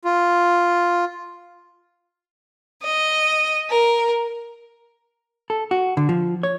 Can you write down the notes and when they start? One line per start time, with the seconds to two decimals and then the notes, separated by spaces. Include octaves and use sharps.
0.05 F4
2.84 D#5
3.70 A#4
5.50 A4
5.71 F#4
5.97 D3
6.09 F3
6.43 C#5